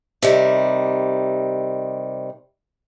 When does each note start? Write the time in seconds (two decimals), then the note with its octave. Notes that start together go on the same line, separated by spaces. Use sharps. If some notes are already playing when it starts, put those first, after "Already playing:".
0.22 C3 D#3 G3